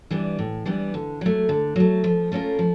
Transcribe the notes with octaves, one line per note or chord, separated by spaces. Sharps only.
E3 G3 B3 D4
A2
E3 G3 B3 D4
D3
F#3 A3
D3
F#3 A3
F3
A3 C#4 F4 A#4
F3